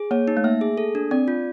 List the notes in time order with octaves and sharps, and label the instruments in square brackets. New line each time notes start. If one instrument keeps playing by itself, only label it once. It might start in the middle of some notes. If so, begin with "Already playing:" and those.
Already playing: [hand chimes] G#4
[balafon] A#3 [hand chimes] C#5
[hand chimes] D#4
[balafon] A3
[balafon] A#3 [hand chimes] E5
[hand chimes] G#4
A4
D4
[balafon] C4 [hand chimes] D5
[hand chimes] F4